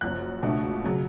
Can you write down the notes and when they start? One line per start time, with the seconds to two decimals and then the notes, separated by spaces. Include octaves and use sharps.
0.01 F#1 F#2 F3 F#6
0.43 C#2 B2 A3 D4
0.84 C#3 F#3